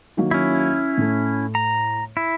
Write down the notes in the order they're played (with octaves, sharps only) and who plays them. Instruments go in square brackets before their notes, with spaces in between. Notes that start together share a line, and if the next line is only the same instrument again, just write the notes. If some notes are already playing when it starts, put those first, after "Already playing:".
[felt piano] D#3 F#3 A#3
[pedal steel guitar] C#4 E4
[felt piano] A2 A3
[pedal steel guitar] A#5
E4